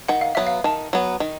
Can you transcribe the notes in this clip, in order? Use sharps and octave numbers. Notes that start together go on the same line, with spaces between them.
D#3 F#5
F5
F#3 B3 E5
F5
D#3 A5
F#3 B3
D#3